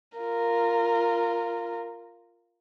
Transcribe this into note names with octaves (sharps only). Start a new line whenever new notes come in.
F4 A#4